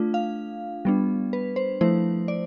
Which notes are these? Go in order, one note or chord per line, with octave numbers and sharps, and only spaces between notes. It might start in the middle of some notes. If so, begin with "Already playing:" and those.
Already playing: A3 D4 F4
F5
G3 B3 D4
B4
C5
F3 A3 E4 C5
D5